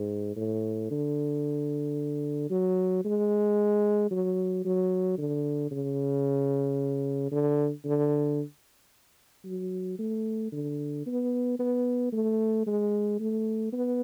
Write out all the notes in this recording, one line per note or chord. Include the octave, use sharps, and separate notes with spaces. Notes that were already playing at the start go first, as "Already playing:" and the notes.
Already playing: G#2
A2
D3
F#3
G#3
F#3
F#3
D3
C#3
D3
D3
F#3
A3
D3
B3
B3
A3
G#3
A3
B3